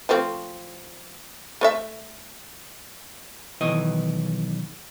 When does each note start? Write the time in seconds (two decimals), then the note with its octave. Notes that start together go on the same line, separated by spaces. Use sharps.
0.09 F3 A3 C4
1.61 A3 C#5 E5
3.61 B1 D#3 E3 D#5